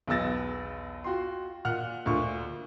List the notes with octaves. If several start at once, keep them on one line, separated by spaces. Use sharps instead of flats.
B1 E2 B3 E6 A6 A#6
F4 F#4 G5 C6
A#2 F#5 F6 F#6
D2 A#2 C#6